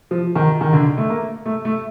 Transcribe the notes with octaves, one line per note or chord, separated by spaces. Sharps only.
F3
D#3
D#3
D3
A3
A#3
A3
A3